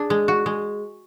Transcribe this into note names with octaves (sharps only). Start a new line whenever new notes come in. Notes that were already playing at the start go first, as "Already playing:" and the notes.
Already playing: D4 G#4
G#3
F#4
G#3